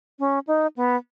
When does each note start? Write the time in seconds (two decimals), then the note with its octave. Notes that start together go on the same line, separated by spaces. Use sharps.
0.19 C#4
0.47 D#4
0.76 B3